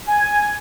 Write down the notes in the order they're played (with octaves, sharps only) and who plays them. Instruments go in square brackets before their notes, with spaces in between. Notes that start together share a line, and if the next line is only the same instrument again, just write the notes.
[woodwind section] G#5